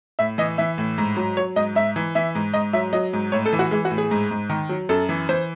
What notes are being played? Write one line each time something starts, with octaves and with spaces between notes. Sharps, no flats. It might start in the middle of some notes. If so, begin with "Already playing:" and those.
A2 E5
E3 D#5
E3 E5
A2
G#2
F#3
F#3 C#5
G#2 D#5
G#2 E5
E3
E3 E5
G#2
G#2 D#5
F#3 E5
F#3 D#5
G#2
A2 C#5
A4
E3
F#4
E3 G#3
F#4
A2
G#4
G#2
G#2
D#3
F#3
F#2 A4
E3
E3 C5